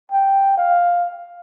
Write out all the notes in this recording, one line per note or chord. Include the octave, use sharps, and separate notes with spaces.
G5
F5